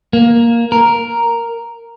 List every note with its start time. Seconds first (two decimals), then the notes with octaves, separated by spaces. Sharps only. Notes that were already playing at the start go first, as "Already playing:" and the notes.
0.13 A#3
0.72 A#4